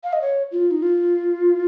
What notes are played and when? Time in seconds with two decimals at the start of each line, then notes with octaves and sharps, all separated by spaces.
0.04 F5
0.13 D#5
0.21 C#5
0.52 F4
0.71 D#4
0.82 F4